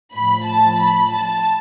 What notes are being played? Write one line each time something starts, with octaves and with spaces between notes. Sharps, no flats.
A2 F3 B5
A5
B5
A5